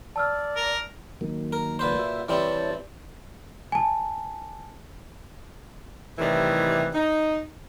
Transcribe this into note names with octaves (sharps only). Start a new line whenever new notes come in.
D5 A5 E6 F6
A#4
D#3 F#3 A#3
A#4
A#2 B4 C5
F#4 E5
E3 G3 C4 E4 C#5 A5
G#5 A5
A2 C3 D#3 E3 G3
D#4